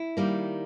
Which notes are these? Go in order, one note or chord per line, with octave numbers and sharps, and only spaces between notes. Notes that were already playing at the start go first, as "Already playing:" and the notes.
Already playing: E4
D#3 G3 A#3